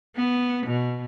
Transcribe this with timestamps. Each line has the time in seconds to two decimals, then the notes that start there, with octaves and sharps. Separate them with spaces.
0.16 B3
0.66 B2